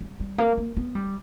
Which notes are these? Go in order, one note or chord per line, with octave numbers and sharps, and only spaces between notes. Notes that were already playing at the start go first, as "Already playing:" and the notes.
G3
G3
A#3
A#3
B3
G3